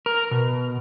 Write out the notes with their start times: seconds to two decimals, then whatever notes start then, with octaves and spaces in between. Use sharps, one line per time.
0.06 A#4
0.31 B2